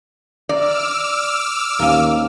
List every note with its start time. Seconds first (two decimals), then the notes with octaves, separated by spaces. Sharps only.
0.49 D5 A#5 D6 E6 F6
1.79 D#2 A#3 C#4